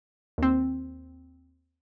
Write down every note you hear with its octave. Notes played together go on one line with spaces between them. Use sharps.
D#2 C4